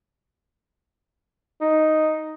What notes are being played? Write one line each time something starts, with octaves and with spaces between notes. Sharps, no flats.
D#4